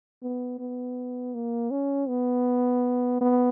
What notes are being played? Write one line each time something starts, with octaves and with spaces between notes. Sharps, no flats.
B3
B3
A#3
C#4
B3
B3